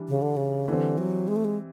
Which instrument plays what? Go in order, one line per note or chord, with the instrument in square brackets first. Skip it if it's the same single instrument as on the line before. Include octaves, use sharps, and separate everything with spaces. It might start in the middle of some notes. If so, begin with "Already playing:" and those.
Already playing: [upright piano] E3 G3 D4
[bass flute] C#3
D3
C#3
[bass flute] D3 [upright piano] E3 G3 C4
[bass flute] F#3
G#3
A3
G#3